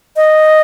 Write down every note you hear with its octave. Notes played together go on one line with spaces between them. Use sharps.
D#5